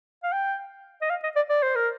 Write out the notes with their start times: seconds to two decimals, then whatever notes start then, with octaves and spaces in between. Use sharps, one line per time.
0.23 F5
0.32 G5
1.01 D#5
1.10 F5
1.23 D#5
1.36 D5
1.49 D5
1.63 C5
1.75 A#4